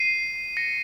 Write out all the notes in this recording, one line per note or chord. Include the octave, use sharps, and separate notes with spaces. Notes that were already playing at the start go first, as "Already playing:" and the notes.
Already playing: C7 D#7
A#6 C#7